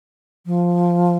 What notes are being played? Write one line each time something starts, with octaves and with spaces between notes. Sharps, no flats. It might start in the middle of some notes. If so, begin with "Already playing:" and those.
F3